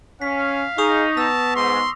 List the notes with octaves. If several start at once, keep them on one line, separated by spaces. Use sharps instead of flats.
C#4 F5 B6
D#4 G#4 C#6 D#6 F7
B3 A5 E6 A#6
G#2 C6